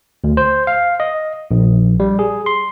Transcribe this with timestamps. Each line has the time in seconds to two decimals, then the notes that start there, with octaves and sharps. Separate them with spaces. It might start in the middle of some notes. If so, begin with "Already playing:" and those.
0.24 D2
0.37 C5
0.67 F5
1.00 D#5
1.51 A#1
2.00 G3
2.19 G#4
2.46 C6